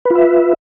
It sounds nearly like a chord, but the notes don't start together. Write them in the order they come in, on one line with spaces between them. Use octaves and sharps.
B4 F4 E5